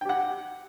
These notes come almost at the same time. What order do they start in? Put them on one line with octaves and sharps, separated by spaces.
G5 G4 F#5